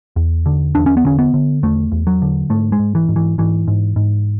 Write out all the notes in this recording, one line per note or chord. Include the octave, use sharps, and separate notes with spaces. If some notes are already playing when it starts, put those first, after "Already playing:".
E2
D3
E2 D4
C#4
B3
D3 C#4
B3
D3
E2 A3
E2
F#3
D3
G#2 A3
G#3
G#2
E3
G#2
E3
G#2 E3
G#2
G#2